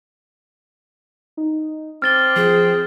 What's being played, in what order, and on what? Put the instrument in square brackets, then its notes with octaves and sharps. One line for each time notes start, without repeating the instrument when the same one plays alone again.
[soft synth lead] D#4
[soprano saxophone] C4 [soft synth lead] D6 [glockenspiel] F6 A6 G7
[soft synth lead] F3 [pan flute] G#4